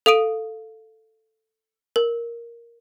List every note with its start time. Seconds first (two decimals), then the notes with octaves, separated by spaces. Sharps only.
0.06 A4 F5 D#6 D7 D#7
1.96 A#4